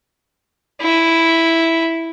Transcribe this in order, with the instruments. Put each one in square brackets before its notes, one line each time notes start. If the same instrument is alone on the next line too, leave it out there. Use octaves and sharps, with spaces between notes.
[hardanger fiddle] E4